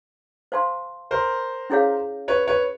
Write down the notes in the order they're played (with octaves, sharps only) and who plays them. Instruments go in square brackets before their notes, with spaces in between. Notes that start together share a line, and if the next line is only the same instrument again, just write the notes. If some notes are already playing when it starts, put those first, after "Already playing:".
[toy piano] C5 F5 A5 C6
[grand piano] A#4 C5
[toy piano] C#4 E4 G#4 C#5 F5
[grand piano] B4 C#5
B4 C#5